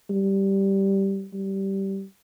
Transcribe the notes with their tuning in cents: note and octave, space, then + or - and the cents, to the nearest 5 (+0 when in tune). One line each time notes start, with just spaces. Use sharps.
G3 -5
G3 -15